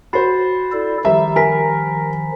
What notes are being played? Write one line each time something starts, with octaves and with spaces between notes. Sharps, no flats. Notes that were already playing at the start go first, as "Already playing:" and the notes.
F#4 C5 B5 A6 C7
E4 A4 D5
D#3 F3 G3 E5 A#5
A#4 G#5 B6